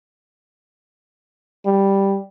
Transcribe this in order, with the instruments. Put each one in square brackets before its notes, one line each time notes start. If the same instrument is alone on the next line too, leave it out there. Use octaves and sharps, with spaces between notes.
[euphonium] G3